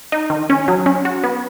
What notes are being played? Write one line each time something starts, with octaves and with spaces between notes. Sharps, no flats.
D#4
D#3
C#4
F#3
C#4
F#4
B3